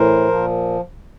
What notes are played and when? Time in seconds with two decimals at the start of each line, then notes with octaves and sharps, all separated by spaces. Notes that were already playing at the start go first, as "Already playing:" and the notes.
Already playing: A2 E3 A#4 C5
0.28 A#2 F3